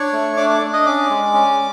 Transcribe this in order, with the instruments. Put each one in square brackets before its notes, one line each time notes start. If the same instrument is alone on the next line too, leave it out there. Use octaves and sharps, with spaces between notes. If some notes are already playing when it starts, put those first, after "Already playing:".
Already playing: [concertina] D4 C#5 C#6
A3
D4 D5 D6
D5 D6
D4
D#5 D#6
C#4 D5 D6
G#3
C#4